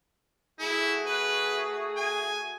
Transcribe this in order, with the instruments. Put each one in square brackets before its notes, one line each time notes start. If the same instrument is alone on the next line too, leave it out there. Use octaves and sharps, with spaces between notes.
[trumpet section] A3 F#4 G#4 [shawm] E4
[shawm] B4
G#5